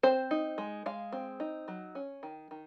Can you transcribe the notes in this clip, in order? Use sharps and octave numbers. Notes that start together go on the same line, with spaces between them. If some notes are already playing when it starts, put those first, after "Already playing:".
C4 C5
D#4
G#3
G#3 F5
C4
D#4
F#3
C#4
D#3
D#3